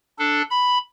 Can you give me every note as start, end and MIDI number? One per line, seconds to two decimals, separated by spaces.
0.19 0.42 62
0.19 0.42 69
0.50 0.78 83